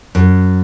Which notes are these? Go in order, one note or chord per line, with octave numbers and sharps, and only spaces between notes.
F#2